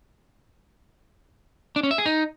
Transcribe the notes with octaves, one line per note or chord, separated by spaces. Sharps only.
D4
C#4
E5
G#4
D#4